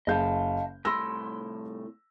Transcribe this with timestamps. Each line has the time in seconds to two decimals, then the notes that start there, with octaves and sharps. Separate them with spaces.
0.07 F#1 D#5 F5 A5 G6
0.85 C2 A2 B5 C6 E6 A#6